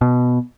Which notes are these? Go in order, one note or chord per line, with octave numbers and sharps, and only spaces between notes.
B2